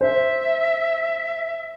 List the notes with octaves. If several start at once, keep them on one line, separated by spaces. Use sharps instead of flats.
C5 E5